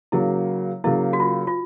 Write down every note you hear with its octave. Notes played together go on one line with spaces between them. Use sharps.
C#3 F#3 A#3 E4
C#3 F#3 A#3 E4
F#4
F4
F4